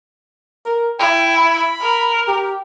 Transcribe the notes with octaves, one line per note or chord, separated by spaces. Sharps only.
A#4
E4 G5
B5
A#4
G4